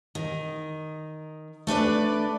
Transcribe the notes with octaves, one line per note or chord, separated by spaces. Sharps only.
D#3
A3 D4 B4 D5